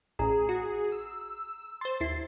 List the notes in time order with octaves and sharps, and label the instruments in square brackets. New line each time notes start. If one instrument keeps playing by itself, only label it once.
[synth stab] A1 [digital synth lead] G#4 [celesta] A#5
[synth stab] F#4
[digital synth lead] E6
[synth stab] C5 C6 [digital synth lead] A6
[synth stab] D#2 E4 C7